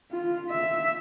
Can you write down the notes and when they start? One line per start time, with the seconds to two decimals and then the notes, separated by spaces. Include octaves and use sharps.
0.12 F4
0.50 E5